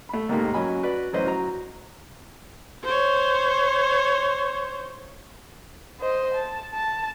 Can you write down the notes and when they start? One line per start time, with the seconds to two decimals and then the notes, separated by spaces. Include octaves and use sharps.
0.09 A3 B5
0.29 D#2 G#2 C3 D#3 A3 A#3
0.54 F#3 C#4 D#5 G#5 B5
0.83 F#4 B4 D5
1.13 A1 F#3 C#4 B4 C5 D#5
1.27 F#3 A#5
2.84 C5 C#5
6.00 C5 D#5
6.34 A5
6.74 A5